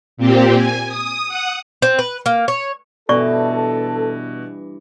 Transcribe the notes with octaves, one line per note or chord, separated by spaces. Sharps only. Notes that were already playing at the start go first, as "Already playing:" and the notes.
A#2 C4 G4
G#5
D#6
F#5 D#6
C4
B4
A#3
C#5
G2 B2 E3 C#4 A4 D5 C#6